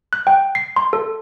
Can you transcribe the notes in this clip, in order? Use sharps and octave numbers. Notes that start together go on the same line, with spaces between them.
F#6
G5
C7
C6
A4